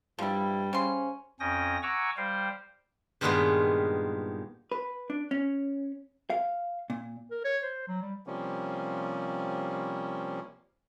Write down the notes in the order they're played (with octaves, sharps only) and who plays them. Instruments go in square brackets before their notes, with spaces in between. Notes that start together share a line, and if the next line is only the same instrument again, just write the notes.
[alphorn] G2 [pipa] F3 E4 [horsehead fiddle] G3
[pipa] C#3 C6 [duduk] C#4 [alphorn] C5
[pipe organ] F2 C#4 G5 D#6 A#6
F#5 G#5 A#5 C#6 D6 E6
G3 C5 F5 G5
[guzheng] G2 A#2 D#3 G#3 B3 F4
[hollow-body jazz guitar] B4
D4
C#4
F5
A#2
[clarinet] A#4
C#5
C5
F#3
G3
[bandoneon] C3 F3 G3 A#3 C#4